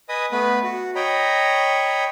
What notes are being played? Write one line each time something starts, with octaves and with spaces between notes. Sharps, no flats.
B4 D#5 G#5 B5 D#6
A3 B3 B4 B5
F#4
C#5 D#5 G5 A#5 B5